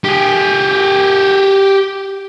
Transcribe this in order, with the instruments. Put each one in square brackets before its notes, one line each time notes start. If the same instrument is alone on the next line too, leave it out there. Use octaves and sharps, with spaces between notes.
[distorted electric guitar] G4 G#4